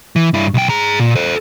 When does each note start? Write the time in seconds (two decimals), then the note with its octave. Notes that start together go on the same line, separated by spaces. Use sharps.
0.16 E3
0.34 G2 E4
0.54 B1 G5
0.69 G#4 A#5
1.00 A#2
1.16 A4 C5